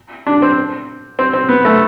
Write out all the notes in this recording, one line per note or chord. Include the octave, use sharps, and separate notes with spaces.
D4
C4
C4
C4
B3
A3